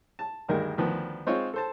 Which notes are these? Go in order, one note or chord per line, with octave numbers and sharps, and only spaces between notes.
A5
D2 G2 D#3 G#3 D#4 A#4
D2 D#3 F3 B3
G#3 C4 D#4 F4 C5 C#5
A4 C5 A5